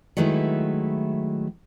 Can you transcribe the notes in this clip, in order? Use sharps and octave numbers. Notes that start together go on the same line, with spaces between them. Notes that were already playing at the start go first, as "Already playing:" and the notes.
D#3 F#3 G#3 A3 E4 B4